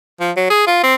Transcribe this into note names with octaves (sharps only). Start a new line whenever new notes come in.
F3
F#3
G#4
F4
C4